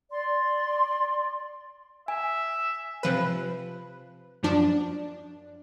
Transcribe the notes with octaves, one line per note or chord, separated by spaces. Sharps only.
D5 C6
E5 G#5
C3 F3 B4
F#2 F3 D4